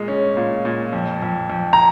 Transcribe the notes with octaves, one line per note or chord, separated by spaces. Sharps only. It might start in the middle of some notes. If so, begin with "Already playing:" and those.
Already playing: A#2 G#3
C#4
A#2
A#2
F2
F2
F2
A#5